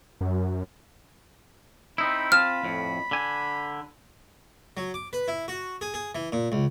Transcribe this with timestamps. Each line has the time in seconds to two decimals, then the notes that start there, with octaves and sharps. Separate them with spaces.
0.21 F#2
1.98 C4 D#4 E4 B5
2.32 C4 F4 A5 F6
2.63 F2 A2
3.11 D3 G#5
4.77 F#3
4.94 D6
5.13 B4
5.28 E4
5.48 F#4
5.81 G#4
5.94 G#4
6.15 E3
6.32 A#2
6.52 C#2